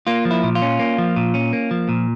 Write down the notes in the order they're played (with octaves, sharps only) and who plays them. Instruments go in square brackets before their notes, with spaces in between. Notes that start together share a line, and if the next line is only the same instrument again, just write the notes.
[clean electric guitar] A#3 F4
F3
E4
A#2
F4
C#4
A#3
F3
A#2
C#4
A#3
F3
A#2